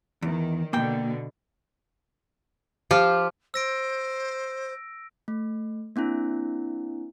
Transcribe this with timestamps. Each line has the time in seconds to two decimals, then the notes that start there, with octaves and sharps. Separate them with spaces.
0.22 E2 D#3
0.73 B2 D3 A#3 G5
2.91 F3 F4 G4
3.54 C5 E6 A#6 D7
5.28 A3
5.96 A#3 C4 D4 E4